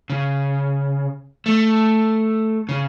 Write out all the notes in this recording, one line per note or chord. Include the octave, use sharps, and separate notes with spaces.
C#3
A3
C#3